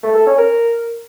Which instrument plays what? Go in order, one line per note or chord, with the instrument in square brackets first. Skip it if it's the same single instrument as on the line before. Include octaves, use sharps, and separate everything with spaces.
[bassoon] A3
A4
C#4
A#4